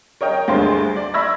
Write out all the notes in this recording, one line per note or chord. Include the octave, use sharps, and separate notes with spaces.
A#4 C#5 D#5 G5
D2 G2 G#3 C5
D5
E5 B5 E6 G#6 A#6